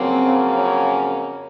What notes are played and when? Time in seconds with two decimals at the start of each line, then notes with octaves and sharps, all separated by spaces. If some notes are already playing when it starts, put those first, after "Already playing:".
Already playing: F2 C#3 F#3 A#3 C4
0.56 C#4